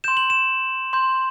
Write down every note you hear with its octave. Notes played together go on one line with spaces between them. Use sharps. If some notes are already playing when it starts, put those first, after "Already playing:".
C6 G6 E7
F#7
E7
C6 G6